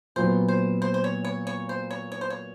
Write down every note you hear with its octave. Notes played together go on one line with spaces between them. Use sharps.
A#2 F#3 B3 C5
C5
C5
C5
C#5
C#5
C#5
C5
C#5
C#5
C5
C#5